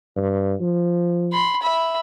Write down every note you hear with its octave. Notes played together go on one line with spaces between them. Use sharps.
G2
F3
B5 C6
E5 B5